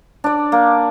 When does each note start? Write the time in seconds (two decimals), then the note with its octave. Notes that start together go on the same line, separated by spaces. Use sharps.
0.24 D4 D5
0.52 A#3